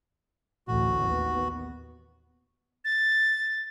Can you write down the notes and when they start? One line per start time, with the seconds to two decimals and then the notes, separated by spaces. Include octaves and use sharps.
0.68 A1 D2 A2 F#4
1.04 D#2 B3
2.85 A6